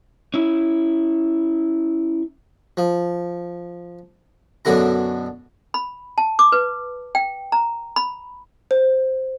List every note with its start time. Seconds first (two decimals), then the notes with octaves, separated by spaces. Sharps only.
0.34 C#4 E4
2.77 F3
4.65 F#2 B2 D3 E4 A#5
5.74 B5
6.18 A5
6.39 D6
6.52 B4
7.15 G5
7.52 A#5
7.96 B5
8.71 C5